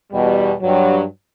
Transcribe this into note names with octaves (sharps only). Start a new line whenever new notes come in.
E2 B2 G3
G2 F#3